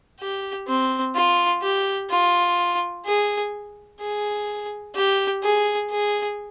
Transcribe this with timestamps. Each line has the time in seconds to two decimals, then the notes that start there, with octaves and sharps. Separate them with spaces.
0.20 G4
0.67 C4
1.15 F4
1.62 G4
2.10 F4
3.06 G#4
4.00 G#4
4.95 G4
5.43 G#4
5.91 G#4